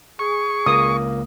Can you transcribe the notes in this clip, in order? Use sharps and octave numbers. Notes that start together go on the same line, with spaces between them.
G#4 C#6
C#2 A#3 D#6